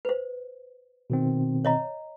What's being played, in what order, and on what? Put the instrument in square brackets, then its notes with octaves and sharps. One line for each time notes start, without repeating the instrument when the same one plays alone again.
[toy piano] B4 C5
[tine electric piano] B2 D#3 C4
[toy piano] C#5 D#5 A#5